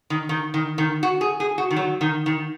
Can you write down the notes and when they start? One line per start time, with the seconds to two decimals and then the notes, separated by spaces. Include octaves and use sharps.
0.10 D#3
0.29 D#3
0.54 D#3
0.78 D#3
1.03 F#4
1.21 G#4
1.40 G#4
1.58 F#4
1.71 D#3
1.76 F#3
2.01 D#3
2.26 D#3